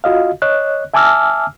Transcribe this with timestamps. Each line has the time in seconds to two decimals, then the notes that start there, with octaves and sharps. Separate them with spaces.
0.04 F4 F#4 D#5 F5
0.42 C#5 D#5 F#6
0.94 E5 G#5 A5 D6 E6 F6